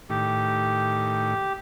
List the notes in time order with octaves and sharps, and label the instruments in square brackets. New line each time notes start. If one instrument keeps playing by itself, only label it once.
[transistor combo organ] A2 D#3 [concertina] G4